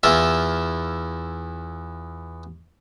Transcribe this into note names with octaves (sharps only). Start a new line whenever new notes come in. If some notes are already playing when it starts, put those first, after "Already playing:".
E2 E4 F4 E5